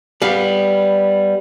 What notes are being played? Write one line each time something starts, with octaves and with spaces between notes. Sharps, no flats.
G3 B3 F5